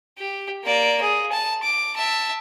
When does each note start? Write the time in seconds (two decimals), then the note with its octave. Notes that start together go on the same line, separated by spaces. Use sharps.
0.18 G4
0.64 A#3 D5
1.01 G#4
1.32 A5
1.63 D6
1.96 E5 A5